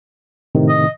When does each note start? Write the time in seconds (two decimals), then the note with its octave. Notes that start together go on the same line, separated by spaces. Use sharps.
0.55 A2 C3 D#3
0.69 D#5